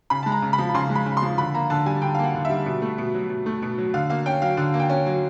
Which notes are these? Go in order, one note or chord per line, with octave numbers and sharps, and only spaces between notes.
C#3 B5
G#3 A5
A#5
C#3
B5
F3
C#3 C6
G#3
B5
C#3
C6
F3
D3 B5
A#3 A#5
D3 A5
G3 G#5
D3 G5
F5
A#3 F#5
D3
E5
G3
B2
A3
B2
F#3
B2
A3
B2
F#3
D3 F5
A#3 F5
C#4 G5
F#3 F5
D3
A#3
G5
C#4
F#3